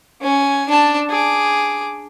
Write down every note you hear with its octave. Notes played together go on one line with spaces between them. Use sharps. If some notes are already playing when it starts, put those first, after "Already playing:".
C#4 G#5
D4 A5
G#4 D6